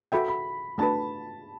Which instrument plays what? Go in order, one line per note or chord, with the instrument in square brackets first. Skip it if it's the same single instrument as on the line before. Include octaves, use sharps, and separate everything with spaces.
[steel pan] F#4 A4 E5 G5 [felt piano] B5
[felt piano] B5
[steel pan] A3 D4 F#4 B4 [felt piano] A5